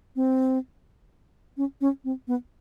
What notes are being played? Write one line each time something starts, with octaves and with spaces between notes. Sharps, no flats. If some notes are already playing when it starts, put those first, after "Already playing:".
C4
C#4
C#4
C4
B3